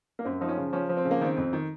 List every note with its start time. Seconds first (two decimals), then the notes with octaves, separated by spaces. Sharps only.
0.19 A#3
0.25 F#2 C4
0.41 F3 D#4
0.49 C#4
0.57 C#3
0.73 F3 C#4
0.89 F3
0.97 C4
1.05 C#3
1.11 A#3
1.21 D#3 C4
1.37 F2
1.53 D#3